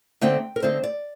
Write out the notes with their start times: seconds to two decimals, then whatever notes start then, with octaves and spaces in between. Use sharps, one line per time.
0.21 D3 A3 C4 D#4 G5
0.56 A#4
0.62 D3 A3 C4 D#4 C5
0.83 D5